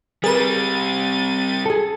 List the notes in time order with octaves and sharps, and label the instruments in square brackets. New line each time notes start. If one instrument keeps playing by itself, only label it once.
[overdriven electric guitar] C3 G3 [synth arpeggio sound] G#4 A#4 B4 [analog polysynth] A6 D#7
[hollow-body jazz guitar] G#4 A4